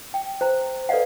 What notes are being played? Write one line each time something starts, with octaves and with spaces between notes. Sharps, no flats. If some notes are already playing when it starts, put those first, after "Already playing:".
G5
C5 A#5
A4 B4 D5 D#5 F5 F#5